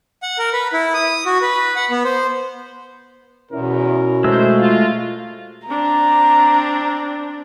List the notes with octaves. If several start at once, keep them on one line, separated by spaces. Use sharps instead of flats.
F#5
A#4
B4
E4
D#6
F#4
B4
F#5
B3
C5
E2 B2 C#4 E4 A#4
G#3 A3 C5 E6
F4
C4 D4 A#5